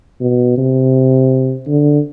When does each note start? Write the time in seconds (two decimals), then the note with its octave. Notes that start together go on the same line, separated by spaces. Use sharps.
0.21 B2
0.58 C3
1.67 D3